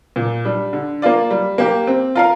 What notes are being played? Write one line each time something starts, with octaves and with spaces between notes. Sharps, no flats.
A#2
G3 D4
D3
A#3 F4 D5
G3
A#3 G4
C4
F4 A#4 F5